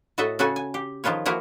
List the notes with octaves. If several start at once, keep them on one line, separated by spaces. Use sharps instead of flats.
A2 F#4 A4 D#5 E5
C#3 F#4 A4 F#5 G#5
G#5
G4
D#3 F3 F4 B4 C#5
F3 A#3 E4 F#4 A#4 B4